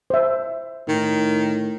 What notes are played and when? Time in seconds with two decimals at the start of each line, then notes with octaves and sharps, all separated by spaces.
0.10 C5 E5
0.88 A2 D#3